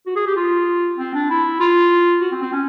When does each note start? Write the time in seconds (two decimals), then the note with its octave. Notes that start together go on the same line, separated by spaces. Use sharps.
0.06 F#4
0.16 G#4
0.27 G4
0.36 F4
0.98 C4
1.14 D4
1.30 E4
1.60 F4
2.21 F#4
2.32 C4
2.42 C4
2.53 C#4